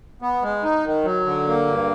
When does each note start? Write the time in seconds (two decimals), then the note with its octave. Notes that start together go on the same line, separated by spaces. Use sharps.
0.22 B3
0.42 G#3
0.63 D#4
0.85 D#3
1.05 F#3
1.26 D3
1.47 A#3
1.67 G2